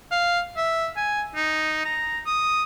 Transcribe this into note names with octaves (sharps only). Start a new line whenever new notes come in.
F5
E5
G#5
D#4
A#5
D#6